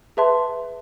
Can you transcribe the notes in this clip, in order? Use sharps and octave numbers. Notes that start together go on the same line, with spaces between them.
G#4 B4 E5 A5 C6